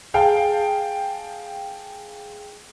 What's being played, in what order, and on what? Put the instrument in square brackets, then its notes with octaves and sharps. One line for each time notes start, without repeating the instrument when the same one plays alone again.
[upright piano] G#4 F5 G5 A5